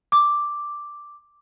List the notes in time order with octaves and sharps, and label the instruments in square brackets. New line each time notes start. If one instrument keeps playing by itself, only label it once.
[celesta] D6